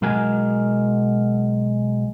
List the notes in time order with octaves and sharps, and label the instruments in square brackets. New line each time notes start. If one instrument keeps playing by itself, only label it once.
[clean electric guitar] B1 F#3 G#3 A#4 G#5